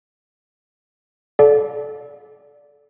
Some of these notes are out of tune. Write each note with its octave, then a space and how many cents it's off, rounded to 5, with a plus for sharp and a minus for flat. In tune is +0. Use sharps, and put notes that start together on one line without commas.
A4 -20 D5 -15 F5 +40